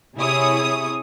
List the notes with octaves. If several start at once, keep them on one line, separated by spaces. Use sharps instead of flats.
C3 E4 G#4 C#5 D#6